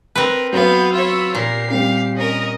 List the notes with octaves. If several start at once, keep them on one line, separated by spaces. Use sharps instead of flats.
C4 A#4 B4
F#3 B3 A4 F5 G6
F4 C#5 B5 E6
A#2 G4 A#4 C7
G3 C4 F5
C#4 A#4 D#5